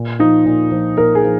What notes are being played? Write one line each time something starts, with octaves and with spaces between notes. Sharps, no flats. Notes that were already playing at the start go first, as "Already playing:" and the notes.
Already playing: A#2
F3 D#4
A#2
F3
A#2 A#4
G#4
F3